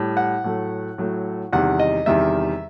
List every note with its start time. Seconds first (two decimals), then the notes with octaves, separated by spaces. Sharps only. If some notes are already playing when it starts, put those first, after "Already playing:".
Already playing: A2 G3
0.17 F#5
0.44 A2 F#3 A3
0.98 A2 F#3 A3
1.53 E2 C3 D#3 G3 F#5
1.80 D#5
2.06 E2 C3 D#3 G3 E5